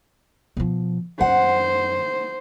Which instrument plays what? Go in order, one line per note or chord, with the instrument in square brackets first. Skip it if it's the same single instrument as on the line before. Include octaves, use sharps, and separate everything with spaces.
[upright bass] B2 F3
[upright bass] F#2 [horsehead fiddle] C5 [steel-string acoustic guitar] F#5